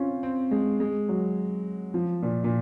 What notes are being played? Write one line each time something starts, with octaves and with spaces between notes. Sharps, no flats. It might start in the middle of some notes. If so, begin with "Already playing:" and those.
Already playing: C4 C#4 F4
C4
G#3
G#3
F#3
F3
A#2
A#2